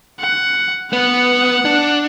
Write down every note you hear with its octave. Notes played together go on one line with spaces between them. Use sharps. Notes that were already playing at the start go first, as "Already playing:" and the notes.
F#5
B3 F#5
D4